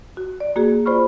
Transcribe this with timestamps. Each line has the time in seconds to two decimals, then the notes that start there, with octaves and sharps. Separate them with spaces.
0.17 F#4
0.40 D5
0.56 A#3 F#4 G#4
0.86 F4 C5 D5 B5 C#6 F6